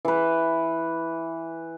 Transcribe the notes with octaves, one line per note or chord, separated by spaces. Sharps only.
E3 B4